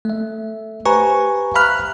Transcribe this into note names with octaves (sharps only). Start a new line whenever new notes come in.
A3 E5
G4 B4 C5 G#5 A#5 C#6
E5 F5 A#5 B5 F6 F#6